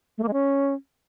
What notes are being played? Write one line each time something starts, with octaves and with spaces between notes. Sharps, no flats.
A3
A#3
G#3
C#4